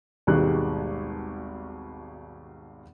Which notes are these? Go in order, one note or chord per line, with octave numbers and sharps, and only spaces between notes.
G#1 D#2 B2 G3 G#3 F#6